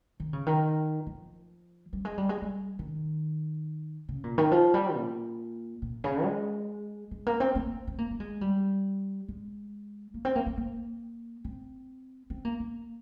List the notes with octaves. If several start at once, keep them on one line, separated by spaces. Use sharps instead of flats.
D#3
C#3
D#3
F3
G3
G#3
G3
G#3
G3
D#3
C#3
A#2
D#3
F3
G3
A#2
A#2
C#3
G#3
G#3
A#3
C4
A#3
A#3
C4
A#3
A#3
G#3
G3
G#3
A#3
C4
A#3
A#3
A#3
C4
C4
A#3
A#3